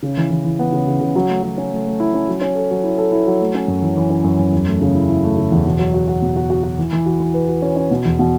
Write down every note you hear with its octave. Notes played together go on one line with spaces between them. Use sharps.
C#3
E3
E3
E3
B3
C#3
C#3
C#3
F#3
A3
F#3
C#4
A3
A3
E4
C#4
F#3
C#4
A4
F#3
E4
A4
E4
F#3
A3
C#4
F#2
E3
E3
C#4
F#2
F#2
E2
A3
C#3
E4
E4
A3
C#3
E2
B2
F#3
F#4
F#4
B2
F#4
F#4
F#4
E3
E3
F#4
E3
B4
F#4
C#4
C#4
B2
E2
B2